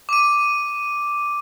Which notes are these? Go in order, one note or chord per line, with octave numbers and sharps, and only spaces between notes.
D6 D#7